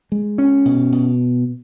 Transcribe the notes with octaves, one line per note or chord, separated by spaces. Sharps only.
G#3
C#4
B2
B2